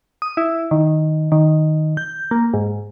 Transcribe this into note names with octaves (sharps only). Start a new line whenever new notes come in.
D#6
E4
D#3
D#3
G6
A#3
G#2